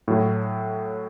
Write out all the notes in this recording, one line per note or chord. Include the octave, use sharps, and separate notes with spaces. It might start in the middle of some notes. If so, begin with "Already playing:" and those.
A2 F#3